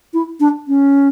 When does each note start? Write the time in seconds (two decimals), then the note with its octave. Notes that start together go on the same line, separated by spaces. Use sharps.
0.14 E4
0.40 D4
0.68 C#4